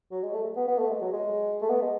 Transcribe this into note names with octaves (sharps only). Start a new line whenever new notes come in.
F#3
G#3
A3
B3
B3
A3
G#3
F#3
G#3
A3
B3
G#3